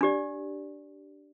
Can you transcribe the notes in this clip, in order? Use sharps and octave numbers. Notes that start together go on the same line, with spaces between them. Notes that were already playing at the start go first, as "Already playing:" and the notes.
D4 G4 D5